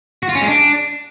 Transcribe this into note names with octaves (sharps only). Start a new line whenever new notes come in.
F#4
F4
C#4
G#3
D4